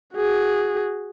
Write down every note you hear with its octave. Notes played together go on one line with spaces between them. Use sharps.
F#4 G#4